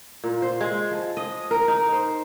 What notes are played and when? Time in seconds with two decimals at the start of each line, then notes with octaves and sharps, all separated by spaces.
0.24 A#2
0.42 C5
0.61 G#3
0.91 F3
1.17 D#5
1.51 A#4
1.68 D#4
1.92 C5